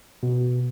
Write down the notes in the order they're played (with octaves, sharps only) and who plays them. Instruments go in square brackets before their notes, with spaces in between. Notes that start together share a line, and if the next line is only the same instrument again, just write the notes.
[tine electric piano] B2